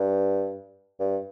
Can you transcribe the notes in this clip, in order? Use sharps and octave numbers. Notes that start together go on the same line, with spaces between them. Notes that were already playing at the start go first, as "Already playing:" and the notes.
Already playing: G2
G2